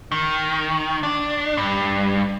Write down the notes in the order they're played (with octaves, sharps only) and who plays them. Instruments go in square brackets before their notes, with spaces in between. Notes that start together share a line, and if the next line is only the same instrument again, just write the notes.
[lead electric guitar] D#3
D4
G2